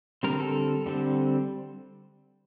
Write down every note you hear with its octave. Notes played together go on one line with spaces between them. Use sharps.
D3 G3 C4 A#4
A4
D3 G3 C4